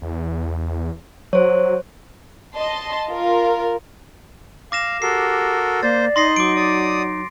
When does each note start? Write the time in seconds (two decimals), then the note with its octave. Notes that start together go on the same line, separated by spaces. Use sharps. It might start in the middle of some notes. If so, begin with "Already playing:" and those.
0.02 E2
1.33 F#3 C5 C#5
2.56 D#5 A5 C6
3.09 F4 A#4
4.72 F5 D6 A#6 E7
5.02 F#4 G4 A4 A#4 C7
5.83 A#3 C5 D5 A6
6.16 D#4 D#5 C6 A#6 C7
6.36 F#3 D6 D7
6.56 D5 D#6